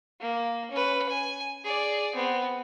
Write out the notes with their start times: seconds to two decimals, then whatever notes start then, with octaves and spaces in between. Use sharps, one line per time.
0.20 A#3
0.71 C#4 B4
1.09 G#5
1.64 G#4 D5
2.15 B3 C4